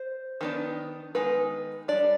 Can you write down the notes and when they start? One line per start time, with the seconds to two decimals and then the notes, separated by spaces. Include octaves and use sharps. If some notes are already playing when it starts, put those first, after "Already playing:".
Already playing: C5
0.41 D#3 B3 D4
1.15 D#3 G#3 B3 D#4 B4
1.88 G3 D4 D5